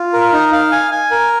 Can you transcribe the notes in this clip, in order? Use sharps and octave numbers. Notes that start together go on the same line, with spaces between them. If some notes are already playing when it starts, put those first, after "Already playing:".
Already playing: F4
A#4
D#4
F5
G#5
G#5
A#4